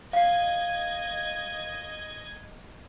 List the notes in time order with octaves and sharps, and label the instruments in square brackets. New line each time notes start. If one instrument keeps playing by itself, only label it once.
[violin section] D#5 G#6 [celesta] F5